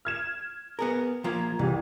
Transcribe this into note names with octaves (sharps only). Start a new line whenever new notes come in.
F6 G#6 E7
B3 G#4 A#4
F3 A#3 F4 A#5 G#6
C2 E3 G4